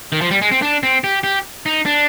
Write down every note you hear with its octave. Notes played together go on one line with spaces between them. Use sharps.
D#3
F3
G3
G#3
C4
D4
C4
G4
G4
D#4
D4